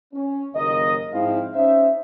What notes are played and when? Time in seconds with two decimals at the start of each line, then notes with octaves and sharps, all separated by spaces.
0.14 C#4
0.55 F#1 D#2 A#4 D#5
1.12 G#2 F3 C4 E4 F5
1.54 C#4 D#4 C5 E5